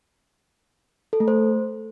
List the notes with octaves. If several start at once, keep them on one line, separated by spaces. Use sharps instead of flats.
A4
A3
C5